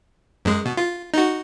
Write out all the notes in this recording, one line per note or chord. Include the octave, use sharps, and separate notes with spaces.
F#2 G#3
B2
F4
D#4 F#4